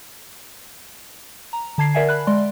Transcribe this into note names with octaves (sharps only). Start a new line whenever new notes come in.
A#5
D3 A5 G#6 C7
A#4 D5 E5 F#5 G#5
B5 F#6
G#3 D5 C6